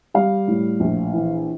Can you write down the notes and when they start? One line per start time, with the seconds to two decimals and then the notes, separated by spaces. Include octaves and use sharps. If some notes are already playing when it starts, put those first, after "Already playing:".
0.14 G3 F5
0.48 A2
0.80 A#1
1.13 E3